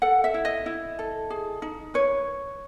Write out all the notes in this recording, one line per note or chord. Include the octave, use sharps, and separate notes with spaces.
A4 F#5
E5
E4
D#5
E4
A4
G#4
D#4
B4 C#5